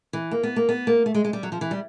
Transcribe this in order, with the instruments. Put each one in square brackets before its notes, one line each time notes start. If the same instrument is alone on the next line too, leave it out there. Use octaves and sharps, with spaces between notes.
[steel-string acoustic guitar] E3
A#3
B3
A#3
B3
A#3
A3
G#3
G#3
G3
F#3
F3
E3
G3